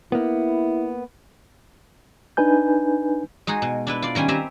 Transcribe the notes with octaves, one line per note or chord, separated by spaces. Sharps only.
A#3 B3 E4
D4 D#4 B4 G#5 G6
G#3 D#4 F#4 G#4
B2
D4 E4 B4
F4 D5
D#3 G3 C#4 G#5
C4 G4 E5 G#5 A#5